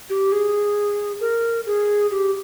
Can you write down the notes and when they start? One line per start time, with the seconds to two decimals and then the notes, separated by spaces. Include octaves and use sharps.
0.10 G4
0.32 G#4
1.21 A#4
1.66 G#4
2.11 G4